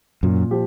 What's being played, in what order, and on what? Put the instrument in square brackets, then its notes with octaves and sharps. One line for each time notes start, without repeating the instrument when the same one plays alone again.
[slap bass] F#2 [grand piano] A#2
[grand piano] F3 G4